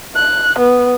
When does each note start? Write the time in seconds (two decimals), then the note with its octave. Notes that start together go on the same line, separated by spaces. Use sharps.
0.15 F#6
0.58 B3